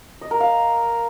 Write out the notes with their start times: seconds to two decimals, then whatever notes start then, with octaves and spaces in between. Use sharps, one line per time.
0.21 D#5
0.31 A#4
0.40 F5